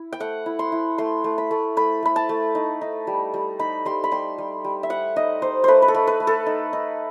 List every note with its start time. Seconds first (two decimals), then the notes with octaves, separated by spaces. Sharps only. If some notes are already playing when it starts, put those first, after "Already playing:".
Already playing: E4
0.13 G5
0.20 A3 F#5
0.46 E4
0.59 C6
0.72 E4
0.98 A3 C6
1.24 A3
1.38 B5
1.51 A3
1.77 A3 B5
2.03 A3 B5
2.16 A5
2.29 A3
2.55 D#4
2.81 D#4
3.07 G3
3.34 G3
3.59 D#4 B5
3.85 G3 C6
4.04 B5
4.12 G3 C6
4.38 G3
4.64 G3
4.83 E5
4.90 G3 F#5
5.16 D#4 D#5
5.42 D#4 C5
5.64 A3 B4 C5
5.82 B4
5.88 A4
5.95 A3
6.07 B4
6.20 A3
6.27 A4
6.46 D#4
6.73 D#4